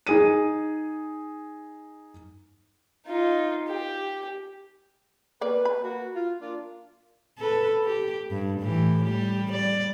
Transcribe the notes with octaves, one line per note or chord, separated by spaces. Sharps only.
D#4 G#4 D#7
D#4 F4
G4
A#3 B4 D5
B5
A#3 F#4
F4
A#3 D4 F4
A4 B4
G4
G2
A2 E3 G4
G3 G4
G3 D5